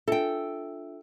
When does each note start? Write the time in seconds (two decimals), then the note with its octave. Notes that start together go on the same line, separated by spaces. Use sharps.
0.08 D4 F4 A4 E5 G5